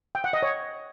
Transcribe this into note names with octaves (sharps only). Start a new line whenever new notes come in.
G5
F#5
D#5
C#5